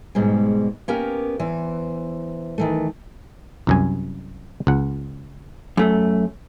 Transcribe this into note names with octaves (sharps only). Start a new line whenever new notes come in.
G#2 B2 G3 G#3
A#3 B3 C#4 G4 A#4
E2 E3 C5
D#3 E3 A3
C2 F#2 G#5
C#2 F#5
F#2 A3